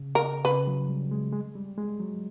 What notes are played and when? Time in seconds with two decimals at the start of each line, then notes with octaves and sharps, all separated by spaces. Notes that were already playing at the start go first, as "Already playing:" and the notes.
Already playing: C#3
0.15 A#4
0.45 C#3 B4
0.67 F#3
0.89 G3
1.11 G#3
1.33 G#3
1.55 G3
1.78 G#3
2.00 F#3